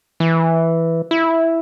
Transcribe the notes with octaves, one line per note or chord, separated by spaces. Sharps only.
E3
E4